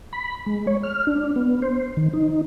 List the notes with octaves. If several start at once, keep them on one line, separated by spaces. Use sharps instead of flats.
B5
G#3
C#5
F6
D4
B3
C5
D#3
D#4